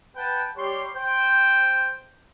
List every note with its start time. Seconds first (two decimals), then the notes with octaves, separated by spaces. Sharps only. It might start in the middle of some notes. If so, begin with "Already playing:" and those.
0.16 B4 F#5 G5 A5
0.56 G3 G4 C#5 C6
0.93 C5 G5